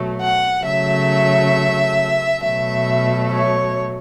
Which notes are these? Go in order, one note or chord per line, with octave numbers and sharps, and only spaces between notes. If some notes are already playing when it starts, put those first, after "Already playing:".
Already playing: B2 F#3 A3
F#5
C#3 F#3 A3 E5
B2 F#3 A3 E5
C#5